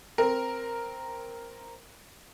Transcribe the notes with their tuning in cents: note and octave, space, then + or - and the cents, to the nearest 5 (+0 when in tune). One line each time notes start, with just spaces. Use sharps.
C4 +0 A#4 +0